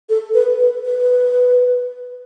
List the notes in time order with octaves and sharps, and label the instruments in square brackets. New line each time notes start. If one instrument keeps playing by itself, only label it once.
[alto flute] A4
B4
B4
B4